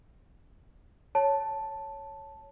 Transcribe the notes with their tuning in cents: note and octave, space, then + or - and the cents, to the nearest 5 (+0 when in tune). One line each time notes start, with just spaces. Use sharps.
C#5 +0 A5 +0